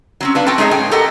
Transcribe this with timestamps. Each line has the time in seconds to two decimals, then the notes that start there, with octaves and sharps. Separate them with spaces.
0.21 F#3 C4 C#4
0.35 D4 B4 F5
0.46 C4 F#4 G5 A5
0.58 G#3 D#4 G#4 C#5 D#5
0.71 A2 G5 G#5
0.91 G4 A4 A#4 D#5 F#5